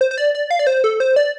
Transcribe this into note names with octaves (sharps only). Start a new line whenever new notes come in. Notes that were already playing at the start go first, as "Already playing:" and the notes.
C5
C5
D5
D5
F5
D5
C5
A4
C5
D5